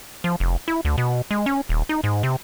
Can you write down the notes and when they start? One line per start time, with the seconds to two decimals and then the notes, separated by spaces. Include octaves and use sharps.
0.24 F3
0.40 F1
0.68 E4
0.85 D2
0.98 B2
1.31 G#3
1.46 C#4
1.69 D#1
1.89 D#4
2.04 G#2
2.23 C3